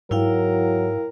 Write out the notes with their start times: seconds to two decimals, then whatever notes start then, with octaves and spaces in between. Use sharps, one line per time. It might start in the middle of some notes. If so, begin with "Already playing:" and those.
0.11 G#2 F#3 E4 A#4 F5 G5